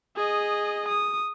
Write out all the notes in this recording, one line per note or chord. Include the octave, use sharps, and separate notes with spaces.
G#4 D#5
D#6